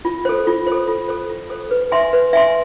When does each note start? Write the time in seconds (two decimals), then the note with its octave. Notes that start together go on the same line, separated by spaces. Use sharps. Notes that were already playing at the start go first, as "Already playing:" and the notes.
0.05 F4
0.25 A4 C5
0.47 F4
0.67 C5
0.72 A4
0.88 F4
1.08 A4 C5
1.30 F4
1.50 A4 C5
1.71 B4
1.92 E5 G#5 C6
2.13 B4
2.33 E5 G#5 C6